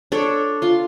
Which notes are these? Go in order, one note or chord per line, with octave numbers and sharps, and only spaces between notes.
D4 A4 C#5
F4 C6